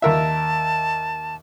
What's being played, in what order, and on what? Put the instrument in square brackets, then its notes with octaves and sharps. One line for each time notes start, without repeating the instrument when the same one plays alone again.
[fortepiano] D#2 A#4 E5 [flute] A5